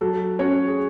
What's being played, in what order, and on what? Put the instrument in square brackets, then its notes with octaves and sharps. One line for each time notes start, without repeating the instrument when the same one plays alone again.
[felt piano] F#3 [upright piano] A4
[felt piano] C#4 F#4 C#5
[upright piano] G#4